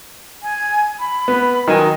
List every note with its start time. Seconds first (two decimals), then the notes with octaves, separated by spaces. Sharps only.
0.43 G#5
0.99 B5
1.28 B3
1.68 D#3 F#3 D#5 G#5